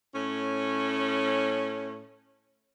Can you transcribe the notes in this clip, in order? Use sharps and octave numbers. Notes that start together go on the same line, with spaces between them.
A2 C#4